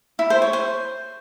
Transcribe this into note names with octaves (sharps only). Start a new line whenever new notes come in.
E4
C5
C#5
C5